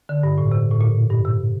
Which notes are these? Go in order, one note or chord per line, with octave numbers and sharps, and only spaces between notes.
D3
G2
A2
C3
A2
A#2
G2
C3